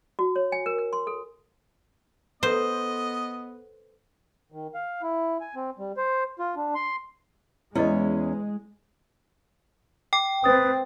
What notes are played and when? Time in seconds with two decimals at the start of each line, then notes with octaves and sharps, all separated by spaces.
0.19 F#4
0.36 C#5
0.52 G#5
0.66 A#4
0.79 A#4
0.93 C6
1.07 A4
2.43 B3 A4 B4 C5 D#5
4.52 D#3
4.75 F5
5.03 E4
5.41 G#5
5.55 C4
5.78 G3
5.97 C5
6.39 F4
6.56 D4
6.75 C6
7.75 E2 G#3 C#4 E4 D#5
10.13 G5 D6
10.44 C4 B4 D#6 A6